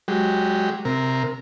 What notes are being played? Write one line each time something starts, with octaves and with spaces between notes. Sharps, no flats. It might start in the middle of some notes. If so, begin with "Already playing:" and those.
F#3 G#3 G4
C3 A#4